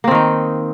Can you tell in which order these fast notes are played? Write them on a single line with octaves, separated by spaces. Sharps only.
A#3 C4 D#3 D#4